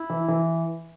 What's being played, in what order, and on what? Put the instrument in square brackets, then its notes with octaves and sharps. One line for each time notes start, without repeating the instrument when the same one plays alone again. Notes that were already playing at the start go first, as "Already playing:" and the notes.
Already playing: [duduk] E4
[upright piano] E3
E3